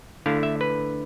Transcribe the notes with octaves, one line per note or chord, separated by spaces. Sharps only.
D3 A3 E4 F5
E5
B4